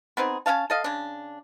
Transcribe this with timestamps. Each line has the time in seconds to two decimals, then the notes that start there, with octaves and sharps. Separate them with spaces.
0.17 B3 C4 D#4 G#4
0.46 C#4 D4 F5 A5
0.70 A4 D#5 F5
0.84 C#3 D4